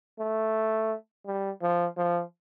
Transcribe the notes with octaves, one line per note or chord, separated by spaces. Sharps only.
A3
G3
F3
F3